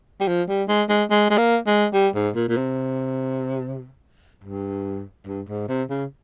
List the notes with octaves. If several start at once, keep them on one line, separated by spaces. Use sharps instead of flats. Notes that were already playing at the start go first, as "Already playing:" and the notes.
G3
F3
G3
G#3
G#3
G#3
G#3
A#3
G#3
G3
G#2
A#2
A#2
C3
G2
G2
G#2
C3
C#3